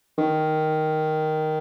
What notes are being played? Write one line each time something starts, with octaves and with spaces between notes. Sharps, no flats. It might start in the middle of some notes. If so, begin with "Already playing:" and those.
D#3